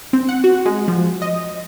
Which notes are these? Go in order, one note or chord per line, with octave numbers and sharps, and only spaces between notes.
C4
F#5
F#4
G#3
F3
D#5